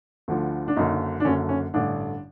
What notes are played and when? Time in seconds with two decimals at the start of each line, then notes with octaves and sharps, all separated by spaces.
0.28 D2 D3 F3
0.68 D4
0.76 F#1 F#2 D3 D#4
1.20 D4
1.25 F#1 F#2 D3 C#4
1.49 C#4
1.74 A1 G2 D3 D4